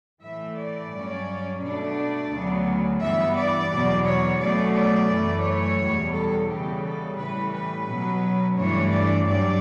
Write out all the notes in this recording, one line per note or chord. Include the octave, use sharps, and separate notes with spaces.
A2 E3 A3 E5
D5
G2 F#3 C#4
B2 A3 D4 D5
D2 C#3 F#3 B3
G2 E3 B3 E5
D5
E2 B2 F#3
C#5
B2 F#3 A3 C#4 D5
D5
F#2 E3 A3
C#5
E2 B2 G3
A4
C#3 E3 G3 B3 G4
A4
A2 E3 G3 C#4 B4
B4
B2 F#3 C#4
G2 E3 A3 D4 C#5
D5
G2 F#3 C#4 D5